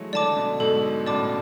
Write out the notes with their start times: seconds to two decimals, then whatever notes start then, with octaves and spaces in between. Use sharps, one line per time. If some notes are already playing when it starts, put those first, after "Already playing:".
Already playing: E3 F#3 G#3 A3
0.13 D3 F#3 D5 A5 D6
0.36 B2 D3
0.60 G#2 B2 A4
1.06 F#2 A2 D5 A5 D6